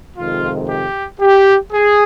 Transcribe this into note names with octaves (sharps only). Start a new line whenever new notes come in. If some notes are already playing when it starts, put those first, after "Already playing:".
F2 C3 D#3 G#3 F4
G4
G4
G#4